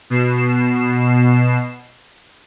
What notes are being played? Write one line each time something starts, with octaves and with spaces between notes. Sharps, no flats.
B2 C7 E7